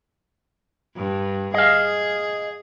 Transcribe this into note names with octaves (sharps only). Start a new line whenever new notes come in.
G2
G#4 D#5 F5